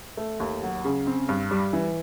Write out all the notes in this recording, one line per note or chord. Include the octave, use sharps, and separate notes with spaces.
A3
D#2
F#3
C#3
C4
G2
G3
E3